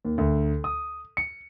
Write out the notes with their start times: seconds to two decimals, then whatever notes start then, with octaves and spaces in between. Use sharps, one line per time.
0.05 D#2
0.18 D2
0.64 D#6
1.17 C#7